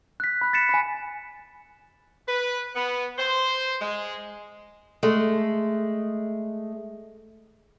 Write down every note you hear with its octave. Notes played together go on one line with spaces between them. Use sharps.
F#6 B6
B5 F#6
A6 B6 C#7 E7
G#5 B5
B4
B3
C5
G#3
G#3 A3